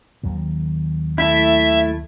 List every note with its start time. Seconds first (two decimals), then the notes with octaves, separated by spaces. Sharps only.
0.23 D#2 D#3 F#3
1.18 A3 E4 E5